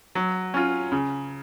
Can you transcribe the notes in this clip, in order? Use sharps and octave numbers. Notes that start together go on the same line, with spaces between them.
F#3
C#4 F4
C#3